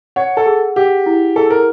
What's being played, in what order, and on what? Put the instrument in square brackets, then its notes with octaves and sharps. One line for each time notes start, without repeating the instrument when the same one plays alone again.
[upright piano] C#5 [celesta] F#5
[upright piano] A4
[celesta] G#4
[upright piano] G4 [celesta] F#5
[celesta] E4
[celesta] G#4 [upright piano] A4
[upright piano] A#4